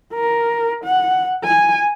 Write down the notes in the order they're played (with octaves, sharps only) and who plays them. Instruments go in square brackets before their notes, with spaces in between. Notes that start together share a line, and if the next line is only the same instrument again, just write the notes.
[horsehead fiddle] A#4
F#5
G#5